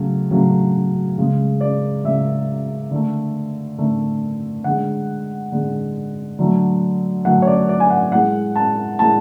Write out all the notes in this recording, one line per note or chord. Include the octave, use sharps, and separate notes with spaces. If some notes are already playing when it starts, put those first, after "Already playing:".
Already playing: C#3 F#3 A3
C#3 F#3 A3
C#3 G#3
D5
C#3 G#3 E5
D3 A3
D3 A3
D3 G#3 F#5
D3 G#3
D3 F#3 A3
D3 F#3 A3 F#5
C#5
D5
D5
G#5
F#5
A2 G#3 F#5
A5
A2 G#3 A5